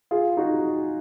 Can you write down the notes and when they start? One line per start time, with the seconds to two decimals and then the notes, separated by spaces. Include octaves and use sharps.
0.11 F4 G#4
0.37 D#4 F#4